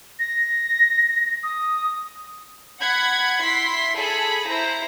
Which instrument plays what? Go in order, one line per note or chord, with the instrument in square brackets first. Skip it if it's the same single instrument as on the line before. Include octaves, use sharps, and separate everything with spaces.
[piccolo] A#6
D#6
[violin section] F#5 B5 G#6
E4 C6 B6
G#4 A4 B5
E4 C5 A#5